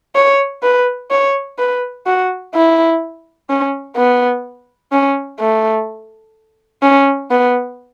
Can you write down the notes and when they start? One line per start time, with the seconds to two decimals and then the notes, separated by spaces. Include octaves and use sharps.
0.15 C#5
0.63 B4
1.11 C#5
1.58 B4
2.06 F#4
2.54 E4
3.49 C#4
3.96 B3
4.92 C#4
5.40 A3
6.82 C#4
7.31 B3